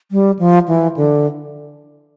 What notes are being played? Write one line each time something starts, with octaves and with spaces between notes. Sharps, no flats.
G3
F3
E3
D3